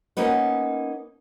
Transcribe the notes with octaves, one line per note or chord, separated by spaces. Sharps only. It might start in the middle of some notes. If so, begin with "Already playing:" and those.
A#3 B3 C#4 D#4 B4